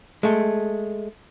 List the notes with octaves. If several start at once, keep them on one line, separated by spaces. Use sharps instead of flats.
G#3 A3